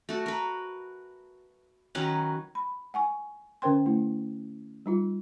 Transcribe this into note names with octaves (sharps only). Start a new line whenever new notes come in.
A3 F#4
A#4 B4
D#3 F#3 C#4 B4
B5
F#5 G#5 C#6
D3 C#4 A#4 C5 G5 C6
A3 E4
G3 D#4 F4